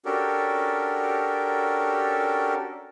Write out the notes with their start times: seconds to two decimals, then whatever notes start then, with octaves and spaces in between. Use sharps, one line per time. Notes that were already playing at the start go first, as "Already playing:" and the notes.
0.05 C#4 D4 F#4 G4 A4 A#4